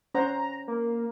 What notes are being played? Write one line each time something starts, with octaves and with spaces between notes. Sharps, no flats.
C#4 C5 F#5 A#5
A#3